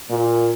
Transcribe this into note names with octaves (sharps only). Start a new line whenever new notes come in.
A#2